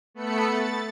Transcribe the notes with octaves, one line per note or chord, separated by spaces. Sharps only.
A3 B3 A4 B5 C#7
A6